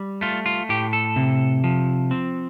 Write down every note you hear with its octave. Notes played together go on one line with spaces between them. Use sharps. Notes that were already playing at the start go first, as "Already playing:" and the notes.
Already playing: G3
A3 F4
F4
A2 G4
A4
C3
F3
C4